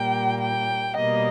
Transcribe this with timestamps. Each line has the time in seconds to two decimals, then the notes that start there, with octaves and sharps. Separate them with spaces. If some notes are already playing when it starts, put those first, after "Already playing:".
Already playing: A#2 G3 A#3 G5
0.41 G5
0.96 B2 G3 A#3 D#5